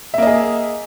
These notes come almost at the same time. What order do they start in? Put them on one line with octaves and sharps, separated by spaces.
E5 A#3 D#5 G#4